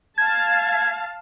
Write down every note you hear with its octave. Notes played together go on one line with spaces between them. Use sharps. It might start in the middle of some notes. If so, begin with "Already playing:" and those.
F5 A5 G#6